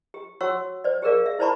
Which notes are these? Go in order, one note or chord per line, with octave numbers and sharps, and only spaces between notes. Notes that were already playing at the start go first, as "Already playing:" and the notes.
G4
F#4 C#5 F#5 C#6 E6
C5 D5
G4 G#4 A#4 D5 F5
E5
E4 C5 D5 A5 B5 C#6